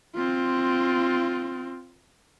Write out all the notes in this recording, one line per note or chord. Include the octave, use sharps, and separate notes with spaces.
C4 F4